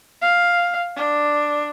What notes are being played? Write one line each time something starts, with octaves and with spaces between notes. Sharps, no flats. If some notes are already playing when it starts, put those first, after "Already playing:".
F5
D4